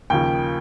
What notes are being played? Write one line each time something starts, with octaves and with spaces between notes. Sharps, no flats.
D#2 C#3 F3 G5